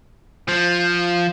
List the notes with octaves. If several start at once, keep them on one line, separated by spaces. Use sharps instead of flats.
F3